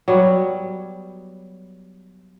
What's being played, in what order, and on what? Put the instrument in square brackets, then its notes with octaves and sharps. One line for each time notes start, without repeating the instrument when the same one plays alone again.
[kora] F#3 G3 B3